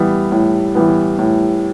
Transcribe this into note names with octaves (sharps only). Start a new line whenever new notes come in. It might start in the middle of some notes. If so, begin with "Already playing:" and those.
Already playing: E3 G3 B3
A2
E3 G3 B3
A2